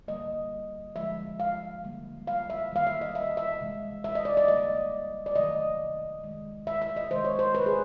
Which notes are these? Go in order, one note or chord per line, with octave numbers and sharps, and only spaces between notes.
D3 G3 A#3 D#5
D3 F3 G#3 E5
F5
D3 G3 A#3
F5
E5
D#3 G3 A#3 F5
E5
D#5
E5
E5
C3 E3 G#3
E5
D#5
D5
D5
D3 G3 A#3 D#5
D5
C3 D#3 F#3 A3 D#5
D#3 G#3
E5
E5
D#5
C3 D#3 G#3 C5
C#5
C5
B4
G#4